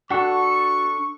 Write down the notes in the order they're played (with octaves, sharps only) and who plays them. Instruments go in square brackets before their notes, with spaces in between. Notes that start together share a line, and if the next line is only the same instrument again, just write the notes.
[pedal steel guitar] D4 A4 [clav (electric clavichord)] F#4 [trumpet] C#6